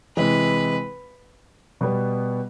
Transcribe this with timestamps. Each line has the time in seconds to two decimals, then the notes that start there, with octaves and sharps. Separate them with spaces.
0.16 C3 E3 G#3 B4
1.81 B2 G3 B3